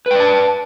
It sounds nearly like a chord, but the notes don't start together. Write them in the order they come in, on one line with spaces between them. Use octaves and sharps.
B4 G5 D5 A5